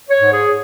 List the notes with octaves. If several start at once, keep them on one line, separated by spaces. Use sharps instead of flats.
C#5
G#2
G#4